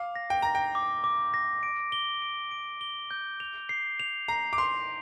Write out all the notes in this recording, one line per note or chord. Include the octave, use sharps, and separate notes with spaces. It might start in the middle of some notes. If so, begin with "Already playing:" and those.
Already playing: F5 D6
A#6
G5
A#5 A#6
G5
D6
D6
A#6
D7
G7
D7
D7
G7
G6
F7
C7
F7
A#5 C7
D6
C6 F7